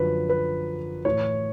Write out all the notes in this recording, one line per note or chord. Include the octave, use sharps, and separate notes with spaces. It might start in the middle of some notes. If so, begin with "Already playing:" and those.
Already playing: F#2 D3 F3 B4
B4
A2 E3 C#5